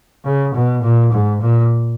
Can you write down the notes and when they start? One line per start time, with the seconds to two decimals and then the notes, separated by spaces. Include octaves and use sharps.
0.25 C#3
0.54 B2
0.82 A#2
1.12 G#2
1.41 A#2